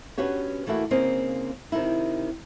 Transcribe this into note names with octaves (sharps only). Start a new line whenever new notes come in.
B3 C#4 D4 F#4 G4 C#5
E3 A3 A#3 E4 F#4
C#3 A#3 C4 D#4 C5 D#5
C3 D#3 D#4 E4